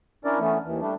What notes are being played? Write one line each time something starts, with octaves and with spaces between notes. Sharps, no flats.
C#4 D4 E4 A#4 D5
E3 A3 B3 C#4
D#2 E3
G3 A3 D4